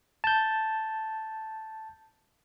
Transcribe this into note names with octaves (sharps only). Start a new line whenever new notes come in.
A5 G6